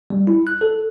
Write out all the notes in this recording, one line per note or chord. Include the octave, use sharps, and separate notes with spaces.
G3
E4
F#6
A4